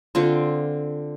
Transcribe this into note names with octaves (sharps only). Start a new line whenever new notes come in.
D3 C4 F4